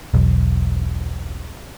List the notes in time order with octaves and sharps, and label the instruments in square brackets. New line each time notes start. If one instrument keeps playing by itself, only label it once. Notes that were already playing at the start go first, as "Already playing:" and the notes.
[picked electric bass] E1 B1